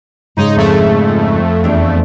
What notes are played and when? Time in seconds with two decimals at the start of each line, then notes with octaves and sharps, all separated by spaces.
0.37 G#2 C#3 G#3 D#4
0.56 F2 A3
1.64 E2 D4 C5